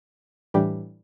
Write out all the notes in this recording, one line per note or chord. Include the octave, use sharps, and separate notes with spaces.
A2 E3 G3 D4 G4